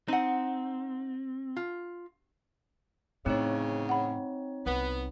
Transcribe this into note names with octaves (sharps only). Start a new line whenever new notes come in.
C4 D#4 F#5
F4
E2 A2 C#3 C4 D#4 C#5
F#5 B5
C2 B3